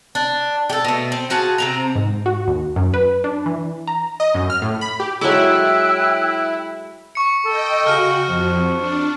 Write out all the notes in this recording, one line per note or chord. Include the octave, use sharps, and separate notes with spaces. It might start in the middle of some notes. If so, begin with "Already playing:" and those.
D4
G4 A4
B2 A3
C4
F4 F#4 G#4 A5
C3 C4 A#5
G#2
F#4
D#2
F#2
B4
D4
E3
A#5
D#5
F#2
F6
A2
B5
G4
F#3 G#3 E4 A4 G5 E6 F#6
C#6 C#7
A4 D#5 G5
C#3 F#4 F6 D#7
F2 F3
D4